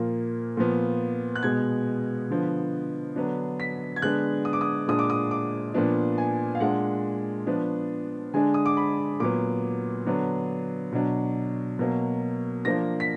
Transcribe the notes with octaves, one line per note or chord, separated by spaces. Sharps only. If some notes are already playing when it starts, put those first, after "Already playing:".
Already playing: A#2 F3 A#3
A#2 F3 B3
F#6
B2 G#3 B3 G#6
D3 F3 B3
D3 F#3 B3 D4
B6
G#6
D3 G#3 B3 D4 F#6
D#6
D6
D#6
A#2 G#3 D4 D#6
D6
D#6
D6
A#2 F3 B3 D4
G#5
F5
A#2 G#3 D4 F#5
F3 B3 D4
D3 G#3 D4 G#5
D#6
D6
B5
A#2 F#3 B3 D6
D3 F#3 B3 D4
B2 F#3 D4
B2 F#3 A#3
F3 A#3 D4 A#6
B6